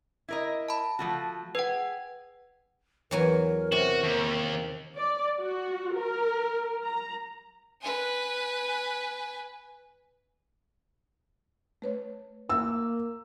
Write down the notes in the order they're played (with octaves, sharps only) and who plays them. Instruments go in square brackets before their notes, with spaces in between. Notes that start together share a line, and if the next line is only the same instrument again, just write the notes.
[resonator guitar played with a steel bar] E4 A#4 D#5
[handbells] A5 B5
[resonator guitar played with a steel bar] F3 A3 F#4
[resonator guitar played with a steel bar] G#4 G5 [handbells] B4 F#5
[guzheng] E2 F#3 G#5 [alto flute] A#4
[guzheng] C3 [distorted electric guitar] F#4
[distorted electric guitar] D#2
[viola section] D5
F#4
A#4
A#5
[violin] B4 G#5
[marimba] A3 B4 C#5
[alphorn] A#3 [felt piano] E6